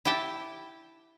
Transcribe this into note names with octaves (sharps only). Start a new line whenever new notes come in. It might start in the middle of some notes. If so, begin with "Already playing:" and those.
E4 G4 G5 A5